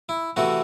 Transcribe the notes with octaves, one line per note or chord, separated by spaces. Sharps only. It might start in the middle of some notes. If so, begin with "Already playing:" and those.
E4
C3 E3 A3 C4 F#4